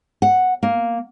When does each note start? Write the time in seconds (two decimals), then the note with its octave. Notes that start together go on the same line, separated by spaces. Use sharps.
0.22 F#5
0.63 A#3